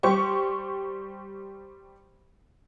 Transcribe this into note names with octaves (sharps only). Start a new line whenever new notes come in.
G3 G4 C5 C#6